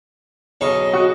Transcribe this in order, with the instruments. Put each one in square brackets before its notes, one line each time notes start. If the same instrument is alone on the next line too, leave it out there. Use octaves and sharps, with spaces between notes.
[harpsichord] B1 C#3 C#6 [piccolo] D#5
[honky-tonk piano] F#4